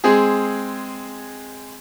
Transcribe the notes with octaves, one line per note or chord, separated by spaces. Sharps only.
G#3 C4 G#4